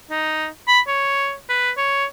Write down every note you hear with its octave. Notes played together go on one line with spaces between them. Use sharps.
D#4
B5
C#5
B4
C#5